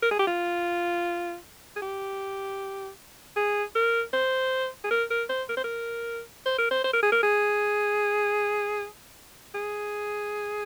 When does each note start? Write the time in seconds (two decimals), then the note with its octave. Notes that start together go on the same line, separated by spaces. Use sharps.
0.02 A#4
0.11 G#4
0.19 G4
0.27 F4
1.76 G#4
1.82 G4
3.36 G#4
3.75 A#4
4.13 C5
4.84 G#4
4.91 A#4
5.10 A#4
5.29 C5
5.49 A#4
5.57 C5
5.64 A#4
6.45 C5
6.58 A#4
6.71 C5
6.84 C5
6.93 A#4
7.02 G#4
7.12 A#4
7.23 G#4
9.54 G#4